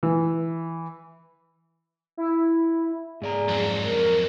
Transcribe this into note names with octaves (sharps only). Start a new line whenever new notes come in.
E3
E4
G#2 G#4 D5 A#5
F2 F#3
A#4